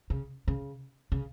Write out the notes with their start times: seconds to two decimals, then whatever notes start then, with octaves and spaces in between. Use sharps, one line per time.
0.10 C#3
0.48 C#3
1.12 C#3